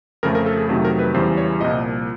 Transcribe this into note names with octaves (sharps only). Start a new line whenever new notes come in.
F2 C#3 F3 A3 A#4
A#4
A4
G#4
F2 C3 D#3 F#3 A3
A#4
B4
E2 C#3 E3 G3 C5
C#5
C2 A#2 F3 D#5